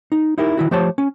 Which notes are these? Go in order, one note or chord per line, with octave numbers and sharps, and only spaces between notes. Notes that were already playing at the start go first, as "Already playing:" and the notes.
D#4
D#4 E4 G4 A#4
D#3 E4 F#4
F3 A3 G4 C5 C#5 A5
C#4